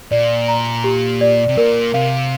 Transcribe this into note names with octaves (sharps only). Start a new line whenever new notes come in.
A#2 D5
A#5
G4
D5
C3
A#2 A#4
C3 F5